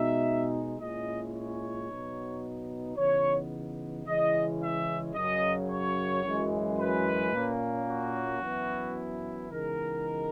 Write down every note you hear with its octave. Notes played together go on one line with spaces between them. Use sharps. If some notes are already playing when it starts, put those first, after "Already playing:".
Already playing: B2 G#3 D#4 E5
A#2 G#3 C#4 E4 D#5
C#5
B2 F#3 B3 D#4
C#3 E3 B3 D#4 C#5
C#3 E3 G#3 C#4 E4 D#5
E5
F#2 C#3 F#3 D#5
C#5
F#2 E3 G#3
B4
A#2 A#3 C#4
F#4
F#2 E3 B3 E4
C#3 E3 G#3 B3 D#4 A#4